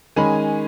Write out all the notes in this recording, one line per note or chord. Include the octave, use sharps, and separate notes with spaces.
D#3 G#3 C#4 G#5 B5